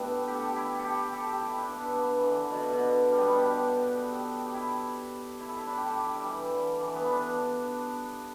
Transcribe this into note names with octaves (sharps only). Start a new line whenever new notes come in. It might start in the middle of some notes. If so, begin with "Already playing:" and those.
Already playing: A3 B3 D4 E4 G4 A4
G4
A4
G4
E4
A4
G4
A4
G4
E4
D4
B3
E4
D4
B3
E3
D3
B2 D3
D3
B2
D3
G3
B3
D4
G4
A4
G4
G4
E4
E4
A4
E4
D4
G4
A4
G4
E4
G3
E3
D3
E3
B3
D4
D4